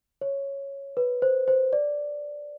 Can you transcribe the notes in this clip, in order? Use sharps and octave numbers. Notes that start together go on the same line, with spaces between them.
C#5
B4
C5
C5
D5